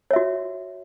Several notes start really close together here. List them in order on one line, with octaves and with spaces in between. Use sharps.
C#5 E5 F#4